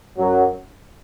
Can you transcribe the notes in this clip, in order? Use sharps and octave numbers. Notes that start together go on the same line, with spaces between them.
F#2 F#3